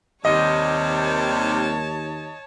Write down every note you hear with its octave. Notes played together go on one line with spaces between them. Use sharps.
D#2 C3 G3 C#5 D#5 A5